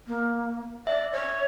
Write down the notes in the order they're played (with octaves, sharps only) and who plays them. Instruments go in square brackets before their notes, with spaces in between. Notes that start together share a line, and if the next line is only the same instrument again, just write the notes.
[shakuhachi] A#3
[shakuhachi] D5 [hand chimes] E5
[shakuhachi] C#5